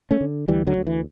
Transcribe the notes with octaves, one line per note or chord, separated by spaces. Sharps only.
A3 C#4
D3
D2 E3 G3
D3 F#3
D2
E3